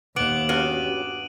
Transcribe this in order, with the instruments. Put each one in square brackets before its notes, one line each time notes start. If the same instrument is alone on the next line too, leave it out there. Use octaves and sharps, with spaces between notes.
[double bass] D#2 [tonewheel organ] A#2 [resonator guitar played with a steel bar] B3 [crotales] D6 D7 F#7
[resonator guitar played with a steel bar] G2 B3 [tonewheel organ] C#4 F#4 G4 [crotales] D#7